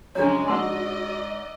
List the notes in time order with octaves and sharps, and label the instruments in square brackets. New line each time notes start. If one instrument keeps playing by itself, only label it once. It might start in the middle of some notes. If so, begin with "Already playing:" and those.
[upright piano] F#2 C#3 [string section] F3 G#3 C#4 [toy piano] D4 C#5 [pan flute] F#4
[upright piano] G#2 E6 [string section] D5 D#5 [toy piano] F#5 A5 C6